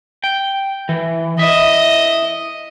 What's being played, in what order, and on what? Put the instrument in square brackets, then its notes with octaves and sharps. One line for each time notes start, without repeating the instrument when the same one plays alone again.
[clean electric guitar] G5
E3
[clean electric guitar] E4 E5 [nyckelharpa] D#5